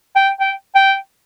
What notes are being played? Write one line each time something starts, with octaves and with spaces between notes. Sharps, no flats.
G5
G5
G5